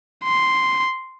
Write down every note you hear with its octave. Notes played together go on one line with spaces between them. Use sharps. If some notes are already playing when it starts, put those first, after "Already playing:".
C6